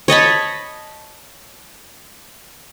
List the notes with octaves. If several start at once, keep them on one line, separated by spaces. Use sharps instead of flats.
C#5 D#5 A5 B5